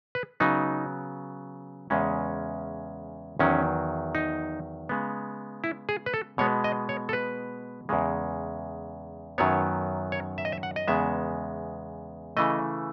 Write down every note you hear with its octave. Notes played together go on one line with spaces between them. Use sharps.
B4
C#3 F#3 B3 D#4
E2 C#3 G#3 C#4
E2 D#3 F#3 C#4
D#4
C#3 G#3 B3
E4
G#4
B4
A4
B2 G#3 B3 C#5
D#5
C#5
A4
B4
E2 C#3 G#3
F#2 D#3 F#3 B3 C#5
C#5
E5
D#5
E5
F#5
D#5
E2 C#3 G#3 B3 E5
C#3 E3 A3 D#5